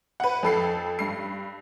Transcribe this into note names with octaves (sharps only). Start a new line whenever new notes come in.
B4 F#5
F2 A4 C7
G2 C7